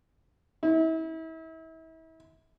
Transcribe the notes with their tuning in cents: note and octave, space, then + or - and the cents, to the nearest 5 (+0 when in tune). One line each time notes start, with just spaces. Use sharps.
E4 -35